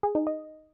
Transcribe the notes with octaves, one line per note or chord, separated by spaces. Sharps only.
G#4
D#4
D#5